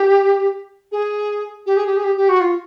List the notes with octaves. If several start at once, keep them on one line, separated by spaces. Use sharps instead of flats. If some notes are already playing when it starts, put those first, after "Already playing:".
Already playing: G4
G#4
G4
G#4
G4
G#4
G4
G4
F#4
F4